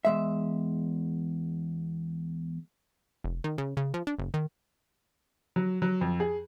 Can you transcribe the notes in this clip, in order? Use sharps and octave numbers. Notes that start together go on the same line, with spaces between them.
E2 G#3 E5
F1
D#3
C#3
C#3
F3
D4
F#1
D#3
F#3
F#3
F2
G#4